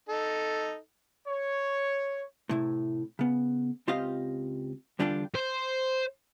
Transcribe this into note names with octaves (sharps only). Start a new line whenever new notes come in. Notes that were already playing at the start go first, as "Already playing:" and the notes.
D#4 A4
C#5
A2 C3 E4
C#3 B3
C#2 C4 F4 G4 D#5 F5
E2 D3 G3 D4 F4 G4
C5